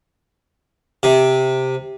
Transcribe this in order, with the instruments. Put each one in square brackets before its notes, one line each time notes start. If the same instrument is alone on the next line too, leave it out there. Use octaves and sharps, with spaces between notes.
[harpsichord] C3